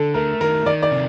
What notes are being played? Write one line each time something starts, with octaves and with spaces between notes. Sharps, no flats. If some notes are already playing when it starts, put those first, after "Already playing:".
Already playing: D3 A4
A3 A#4
D#3 A#4
D#3 D5
D5
C3